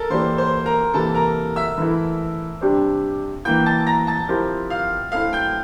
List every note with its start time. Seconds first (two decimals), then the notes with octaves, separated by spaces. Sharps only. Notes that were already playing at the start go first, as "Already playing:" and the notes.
Already playing: A4 A#4 A5
0.10 E3 A#3 E4 G4 C5 D5 C6
0.38 C5 C6
0.66 A#4 A#5
0.94 C3 E3 A#3 E4 A4 A5
1.14 A#4 A#5
1.56 E5 E6
1.78 E3 A3 E4
2.61 C3 G3 D4 G4 C5
3.45 E3 A#3 E4 G5 G6
3.66 A5 A6
3.87 A#5 A#6
4.07 A5 A6
4.28 F3 C4 E4 G4 A#4
4.70 F5 F6
5.12 A3 C4 E4 F5 F6
5.33 G5 G6